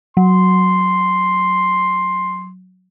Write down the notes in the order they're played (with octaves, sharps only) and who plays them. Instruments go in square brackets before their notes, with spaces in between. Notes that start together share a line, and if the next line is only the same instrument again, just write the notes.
[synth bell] F#3 [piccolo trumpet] C6